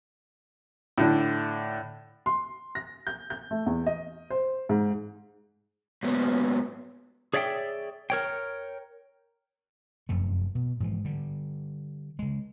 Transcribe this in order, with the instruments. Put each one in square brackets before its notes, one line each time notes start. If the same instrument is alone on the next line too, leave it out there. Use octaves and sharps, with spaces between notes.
[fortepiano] A2 D3 D4
[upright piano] C6
A#6
G6
G6
A3
E2
D#5
C5
G#2
[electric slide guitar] G#2 F#3 A#3 B3
G#4 C#5 D5 E5 F#5 G5
A#4 C#5 G5
[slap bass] F1 F#2 F3 A3
B2
G#2 E3 F3
D3 G3
C#3 G#3